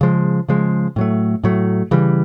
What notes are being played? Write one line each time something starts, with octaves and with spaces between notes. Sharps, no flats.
C#3 F3 G#3
C#3 F3 G#3
A2 F#3 A3
A2 F#3 A3
C#3 E3 G3